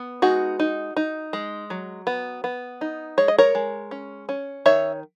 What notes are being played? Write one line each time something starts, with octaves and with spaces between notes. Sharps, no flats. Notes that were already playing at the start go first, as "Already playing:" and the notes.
Already playing: B3
G#3 D#4 F#4
D#4
D#4
G#3
F#3
B3
B3
D#4
G#3 C#5
D#5
A#4 C#5
G#3
C#4
C#4
D#3 C#5 E5